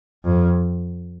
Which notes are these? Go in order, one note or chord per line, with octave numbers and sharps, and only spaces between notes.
F2